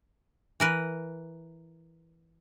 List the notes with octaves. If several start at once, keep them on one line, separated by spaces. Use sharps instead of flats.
E3 A#4 B4